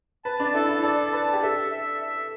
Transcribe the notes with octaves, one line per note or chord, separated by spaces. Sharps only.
B4 A5
D4
E4 A4
E4
A4 D5
B4 A5
G4
A4 E5
E5
E5